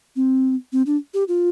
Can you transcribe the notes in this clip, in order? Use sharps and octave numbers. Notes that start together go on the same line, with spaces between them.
C4
C4
D4
G4
F4